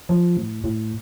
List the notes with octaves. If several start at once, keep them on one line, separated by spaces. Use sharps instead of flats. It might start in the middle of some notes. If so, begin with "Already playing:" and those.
F3
A2
A2